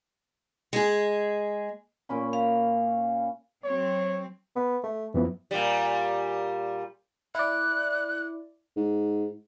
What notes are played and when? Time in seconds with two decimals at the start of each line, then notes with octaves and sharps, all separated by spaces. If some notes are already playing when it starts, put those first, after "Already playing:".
0.73 G#3 G#4
2.09 A#2 C#4 B5
2.33 F5
3.64 F#3 C4 C#5
4.56 B3
4.83 A3
5.14 F#2 E3 F3 B3
5.51 A#2 G3
7.35 E4 D5 F#6
8.76 G#2